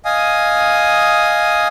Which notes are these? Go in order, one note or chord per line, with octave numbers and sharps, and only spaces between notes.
D#5 F5 G#5 D#6